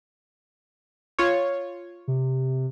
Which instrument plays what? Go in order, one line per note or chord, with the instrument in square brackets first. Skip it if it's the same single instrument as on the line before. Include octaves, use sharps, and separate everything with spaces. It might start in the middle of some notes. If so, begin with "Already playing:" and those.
[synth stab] F4 C#5
[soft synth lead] C3